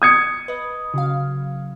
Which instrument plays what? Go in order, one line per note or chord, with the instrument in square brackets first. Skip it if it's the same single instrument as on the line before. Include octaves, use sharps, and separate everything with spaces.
[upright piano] D#6 G#6 C#7
[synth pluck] B4 D#5
C#3 F#3 F5